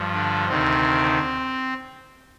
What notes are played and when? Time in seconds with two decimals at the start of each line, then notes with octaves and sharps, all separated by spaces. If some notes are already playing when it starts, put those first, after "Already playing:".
Already playing: G2 F3
0.14 D3 D4
0.48 D2 C3 D#3 C4